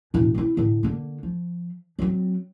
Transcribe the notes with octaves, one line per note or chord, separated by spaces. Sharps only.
E1 A2
C4 E4
A2 D3
D3 A#3
F3
F#3 C4